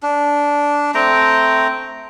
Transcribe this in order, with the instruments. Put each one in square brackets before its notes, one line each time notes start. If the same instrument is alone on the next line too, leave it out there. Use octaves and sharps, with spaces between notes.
[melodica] D4
A3 C4 G5 A#5